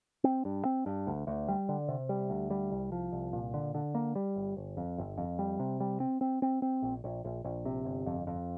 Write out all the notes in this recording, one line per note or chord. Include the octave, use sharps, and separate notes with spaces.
C4
G2
C4
G2
D2
D2
G3
D3
C3
G3
D2
G3
C2
F3
C2
A#2
D3
D3
A#3
G3
G1
G1
F2
G1
F2
G3
C3
G3
C4
C4
C4
C4
A#1
A#1
A#1
A#1
C3
G1
F2
F2